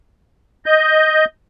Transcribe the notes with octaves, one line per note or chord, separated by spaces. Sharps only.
D#5 G6